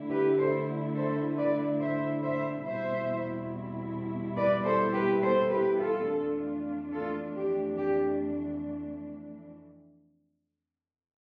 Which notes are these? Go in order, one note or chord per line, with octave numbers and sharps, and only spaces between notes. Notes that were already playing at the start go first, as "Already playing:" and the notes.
Already playing: D3 A3 E4
G4 B4
A4 C5
A4 C5
B4 D5
C5 E5
C5 E5
E2 B2 G3 C4 E4 C5 E5
B4 D5
A4 C5
G4 B4
A4 C5
G4 B4
F4 A4
F2 E3 A3 D4 F4
F4 A4
G4
G4